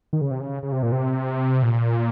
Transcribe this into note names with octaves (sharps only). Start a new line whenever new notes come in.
D#3
C#3
C3
C#3
C#3
C3
A#2
C3
A#2